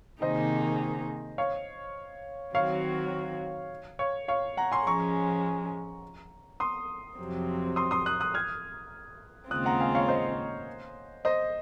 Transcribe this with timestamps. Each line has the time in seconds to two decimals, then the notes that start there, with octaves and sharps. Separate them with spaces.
0.22 C3 D#3 A#3 D#4 G#4 C5 D#5
1.38 C#5 F5
2.54 D#3 F#3 C4 F#4 C#5 F5
3.99 C#5 F5
4.28 C#5 F5
4.57 F#5 A#5
4.72 G#5 C6
4.86 F3 G#3 C#4 A#5 C#6
6.60 C6 D#6
7.19 F2 C3 F#3 C4
7.76 C6 D#6
7.91 C6 D#6
8.06 D#6 F#6
8.20 D#6 F#6
8.34 F6 G#6
9.51 D#2 C#3 G#3 C4 F4 D#6 F#6
9.66 F#5 A#5
9.80 F5 G#5
9.95 C#5 F5
10.09 C5 D#5
11.25 C5 D#5